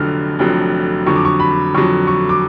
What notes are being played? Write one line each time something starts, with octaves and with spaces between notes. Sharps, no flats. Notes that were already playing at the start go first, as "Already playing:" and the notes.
Already playing: F1 F2 D3 F#3 F6
F1 F2 D3 F#3
F2 D3 F#3 C#6
D6
C#6
B5
F2 D3 F#3 C#6
C#6
D6